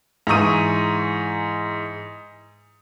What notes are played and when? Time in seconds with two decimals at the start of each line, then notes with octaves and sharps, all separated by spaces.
0.27 G#2 E3 A#5 C#6 D#6 D#7